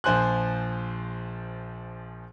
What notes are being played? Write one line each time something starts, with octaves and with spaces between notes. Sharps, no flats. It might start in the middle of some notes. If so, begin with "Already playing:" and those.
A#1 F3 C5 G#5 C6 F#6